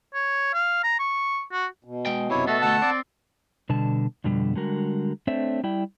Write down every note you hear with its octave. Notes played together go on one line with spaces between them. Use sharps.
C#5
F5
A#5
C#6
F#4
B2
G#3 G5
F#2 C3 E4 C#5
A3 B3 F#4 A4
D2 A3 F#5 A5
C4 D5
B2 D3 G3 A5
F2 B2 D3 G3
D3 G3 G#3 F#4 A#4
A3 C4 D4 C5 C#5 E5
G3 E4 D5 G5